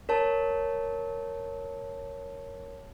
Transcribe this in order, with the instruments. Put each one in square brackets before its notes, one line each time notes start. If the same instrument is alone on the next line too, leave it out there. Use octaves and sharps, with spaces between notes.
[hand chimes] A#4 C#5 A5